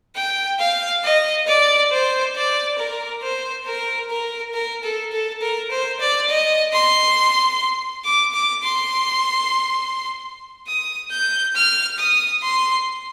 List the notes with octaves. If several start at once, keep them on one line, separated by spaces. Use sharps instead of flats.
G5
F5
D#5
D5
C5
D5
A#4
C5
A#4
A#4
A#4
A4
A4
A#4
C5
D5
D#5
C6
D6
D6
C6
D#6
G6
F6
D#6
C6